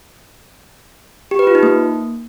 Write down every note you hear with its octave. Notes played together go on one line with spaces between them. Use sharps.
G4
B4
F4
D#4
A#3